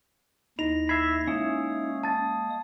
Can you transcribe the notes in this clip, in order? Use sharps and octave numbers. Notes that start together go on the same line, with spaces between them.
D#2 D#4 E4 A#6 F7
E5 B5 G#6 C7
G#3 A#3 C#4 E4 D#6
A5 A6